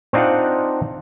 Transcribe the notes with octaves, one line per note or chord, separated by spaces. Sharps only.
C4 D4 D#4 F4 F5 F#5